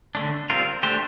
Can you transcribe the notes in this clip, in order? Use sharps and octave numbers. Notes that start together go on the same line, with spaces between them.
D3 A3 D4
G3 C4 F4 A#4
A3 D4 G4 C5